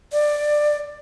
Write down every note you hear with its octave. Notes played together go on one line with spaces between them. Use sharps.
D5